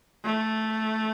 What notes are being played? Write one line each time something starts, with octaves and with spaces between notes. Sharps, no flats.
A3